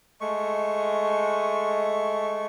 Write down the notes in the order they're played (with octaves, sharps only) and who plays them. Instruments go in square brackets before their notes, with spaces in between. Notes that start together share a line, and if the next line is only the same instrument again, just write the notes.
[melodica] G#3 A3 C#6